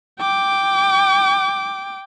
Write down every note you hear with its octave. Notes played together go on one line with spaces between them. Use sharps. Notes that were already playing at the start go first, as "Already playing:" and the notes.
G5 D6